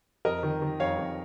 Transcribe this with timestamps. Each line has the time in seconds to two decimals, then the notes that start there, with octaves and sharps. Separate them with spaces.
0.25 F2 A#4 D#5
0.43 D#3
0.62 D#3
0.80 F2 C#5 F5
0.98 F2